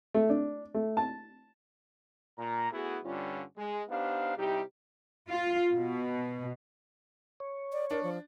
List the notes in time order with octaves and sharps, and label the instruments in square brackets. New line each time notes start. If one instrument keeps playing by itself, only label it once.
[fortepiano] A3
D4
A3
A5
[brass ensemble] A#2 A#5
A3 B3 E4 F#4 G#4
G2 D3 G3 C#4 F4
G#3
B3 D4 D#4 G4 C5 F5
C3 G3 D#4 E4 G4
[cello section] F4
B2
[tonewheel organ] C#5
[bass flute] D5
[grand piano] D4 [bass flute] A#4
[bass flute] F3